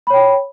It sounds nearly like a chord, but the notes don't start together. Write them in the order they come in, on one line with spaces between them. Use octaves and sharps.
B5 C#5 G5